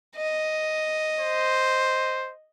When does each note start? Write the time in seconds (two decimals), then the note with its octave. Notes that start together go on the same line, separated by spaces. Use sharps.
0.16 D#5
1.19 C5